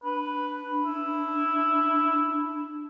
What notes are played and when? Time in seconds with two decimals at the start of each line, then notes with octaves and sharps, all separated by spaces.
0.04 D4 B4
0.85 E4